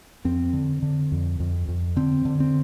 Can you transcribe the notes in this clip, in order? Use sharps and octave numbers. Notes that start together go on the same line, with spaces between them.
F2 C4
D3
D3
F2
F2
F2
D3 C4
D3
C4